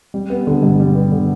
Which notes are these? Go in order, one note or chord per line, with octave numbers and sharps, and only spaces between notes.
G3
B3
D3
G2
G3
B3
D3